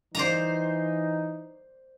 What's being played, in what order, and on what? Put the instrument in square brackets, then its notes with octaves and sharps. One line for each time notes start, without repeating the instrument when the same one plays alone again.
[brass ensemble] E3 D#4 [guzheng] C5 D5 A#5